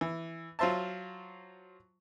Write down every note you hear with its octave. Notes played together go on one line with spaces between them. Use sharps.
E3
F#3 F4 C5 E5 A5